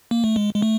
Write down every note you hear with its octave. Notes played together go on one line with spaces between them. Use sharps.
A#3
A3
G#3
G#3
A3